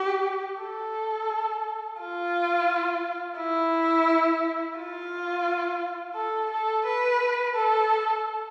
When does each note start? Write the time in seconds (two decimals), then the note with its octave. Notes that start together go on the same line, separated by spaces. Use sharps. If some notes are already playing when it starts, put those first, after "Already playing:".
Already playing: G4
0.61 A4
2.00 F4
3.38 E4
4.78 F4
6.15 A4
6.51 A4
6.86 B4
7.55 A4